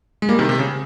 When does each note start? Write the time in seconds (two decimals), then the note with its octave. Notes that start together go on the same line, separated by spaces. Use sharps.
0.22 G#3
0.29 G3 A#3
0.39 C3 D#3
0.49 C3
0.59 C#3